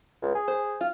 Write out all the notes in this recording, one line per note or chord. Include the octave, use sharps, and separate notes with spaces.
C#2
G#4
C5
F4